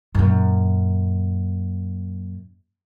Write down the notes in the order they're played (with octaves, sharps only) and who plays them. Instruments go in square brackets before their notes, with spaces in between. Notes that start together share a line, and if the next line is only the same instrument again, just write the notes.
[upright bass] F#2 A#2